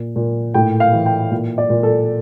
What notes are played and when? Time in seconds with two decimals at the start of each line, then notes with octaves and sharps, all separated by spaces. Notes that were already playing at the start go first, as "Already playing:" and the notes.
Already playing: A#2
0.16 A#2
0.54 A2 G5
0.80 F5
0.93 E3
1.06 G5
1.31 A#2
1.58 D5
1.70 A#2
1.83 A4